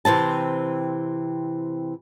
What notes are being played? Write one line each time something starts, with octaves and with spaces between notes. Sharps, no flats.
C3 E3 C4 A5